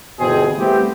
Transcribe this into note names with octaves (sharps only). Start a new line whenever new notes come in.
G1 B2 E3 C4 G#4
G3 A3 B3 C4 E4 G4